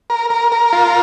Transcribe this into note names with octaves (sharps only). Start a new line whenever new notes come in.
A#4
A#4
A#4
F4